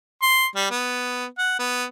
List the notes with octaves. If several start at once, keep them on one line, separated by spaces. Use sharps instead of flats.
C6
G3
B3
F#5
B3